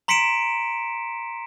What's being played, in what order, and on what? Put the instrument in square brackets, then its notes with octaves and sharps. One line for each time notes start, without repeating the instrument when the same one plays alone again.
[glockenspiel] A#5 C6 B6 C#7 D7 E7